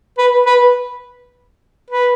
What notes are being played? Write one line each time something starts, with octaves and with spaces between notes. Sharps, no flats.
B4
B4
B4